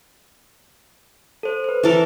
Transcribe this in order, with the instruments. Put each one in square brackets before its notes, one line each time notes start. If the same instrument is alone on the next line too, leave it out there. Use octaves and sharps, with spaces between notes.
[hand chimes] A4 C5
B4 C5
[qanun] E3 A4 A#4